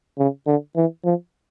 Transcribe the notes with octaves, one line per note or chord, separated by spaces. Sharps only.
C#3
D3
E3
F3